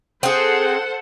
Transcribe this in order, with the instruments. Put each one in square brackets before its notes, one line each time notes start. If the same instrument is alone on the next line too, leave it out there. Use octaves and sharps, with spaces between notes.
[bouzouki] C4 G#4 [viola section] A4 C5 F#5